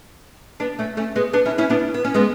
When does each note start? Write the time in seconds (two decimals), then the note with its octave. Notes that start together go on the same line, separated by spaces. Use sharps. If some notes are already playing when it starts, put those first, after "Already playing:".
0.60 B3 D4
0.79 A3 C#4
0.97 A3 C#4
1.16 G#3 B3
1.33 B3 D4
1.46 C#4 E4
1.58 C#4 E4
1.70 B3 D4
1.94 B3
2.04 C#4
2.14 G#3 B3